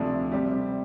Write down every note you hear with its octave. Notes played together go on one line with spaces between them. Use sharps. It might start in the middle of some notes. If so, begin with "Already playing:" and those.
Already playing: D2 C3 F3 A3 D4
C3 G3 C4 G4